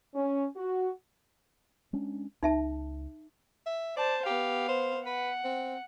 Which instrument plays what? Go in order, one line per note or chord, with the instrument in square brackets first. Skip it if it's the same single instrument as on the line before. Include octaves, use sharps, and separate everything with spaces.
[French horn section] C#4
F#4
[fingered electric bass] G#3 C#4 D4
[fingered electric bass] C#2 [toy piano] D#4 E5 A5
[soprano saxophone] E5
[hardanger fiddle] C5 A5 [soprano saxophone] D5
[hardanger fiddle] B3 F5 [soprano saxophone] G4
[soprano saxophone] C5
[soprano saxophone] B4 [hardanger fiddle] F#5
[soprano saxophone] C4